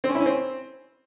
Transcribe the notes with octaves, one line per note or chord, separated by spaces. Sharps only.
C4
C#4
E4
C#4
C4